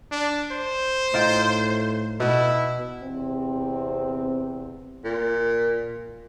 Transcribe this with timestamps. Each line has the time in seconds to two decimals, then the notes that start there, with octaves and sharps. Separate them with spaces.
0.12 D4
0.52 C5
1.14 A2 D#4 F4 G5
2.20 B2 E4
3.04 E2 C3 C4
5.04 A#2